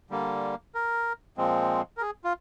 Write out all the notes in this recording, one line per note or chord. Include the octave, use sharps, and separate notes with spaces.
D3 G3 A#3
A#4
A#2 F3 G#3 C4
A#4
G#4
F4